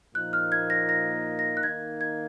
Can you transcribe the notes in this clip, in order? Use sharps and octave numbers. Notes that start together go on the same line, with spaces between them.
A#2 F3 A#3 D#4 F#6
F6
G#6
A#6
A#6
A#6
F#6
D#3 A#3 D#4 G#6
G#6